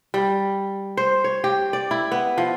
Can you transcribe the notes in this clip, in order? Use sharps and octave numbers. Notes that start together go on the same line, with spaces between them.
G3
C5
C#5
G4
D5
E4
B3
F3